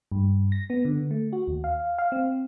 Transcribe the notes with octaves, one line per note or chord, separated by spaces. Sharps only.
G2
A#6
B3
D3
A3
F#4
D#2
F5
F5
C4